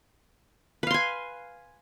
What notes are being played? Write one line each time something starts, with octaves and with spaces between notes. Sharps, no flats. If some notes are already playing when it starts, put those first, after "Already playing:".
B4 F5 G#5 C6